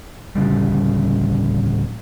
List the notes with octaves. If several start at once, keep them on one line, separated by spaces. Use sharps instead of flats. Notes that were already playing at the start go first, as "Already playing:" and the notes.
D1 D#2 C#3 G3